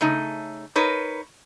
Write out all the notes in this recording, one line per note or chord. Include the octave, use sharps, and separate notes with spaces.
C#3 A3 D#4
D#4 A#4 B4 C#5